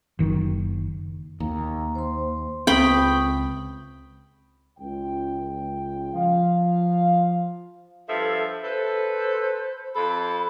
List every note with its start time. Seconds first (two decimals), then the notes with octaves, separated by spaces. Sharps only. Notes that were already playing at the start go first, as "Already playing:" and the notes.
0.19 F#1 D#3
1.40 D#2 A#5
1.95 C5 C6
2.67 C#2 C4 G5 B5 C#6 D#6
4.78 C#2 G5
6.14 F3 F5
8.08 G2 F3 A4 E5
8.63 A4 B4 C5
9.95 F2 A4 B5